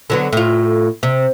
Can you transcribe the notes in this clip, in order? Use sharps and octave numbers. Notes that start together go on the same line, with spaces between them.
D3 F#3 B3
A2 F4
C3